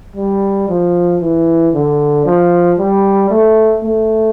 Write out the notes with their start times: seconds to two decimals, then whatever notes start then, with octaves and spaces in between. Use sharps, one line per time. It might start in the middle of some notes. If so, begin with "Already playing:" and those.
0.16 G3
0.69 F3
1.21 E3
1.74 D3
2.26 F3
2.79 G3
3.31 A3
3.84 A3